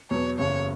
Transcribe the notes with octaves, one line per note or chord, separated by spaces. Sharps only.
E2 B2 F#3 B3 C#5
F#1 E2 C#3 C#5